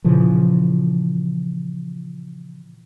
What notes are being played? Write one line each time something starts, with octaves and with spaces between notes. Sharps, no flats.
A#2 C#3 E3 F3